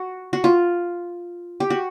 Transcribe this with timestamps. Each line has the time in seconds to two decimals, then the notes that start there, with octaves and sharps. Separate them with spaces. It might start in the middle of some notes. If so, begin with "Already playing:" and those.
Already playing: F#4
0.33 F#4
0.44 F4
1.60 G4
1.70 F#4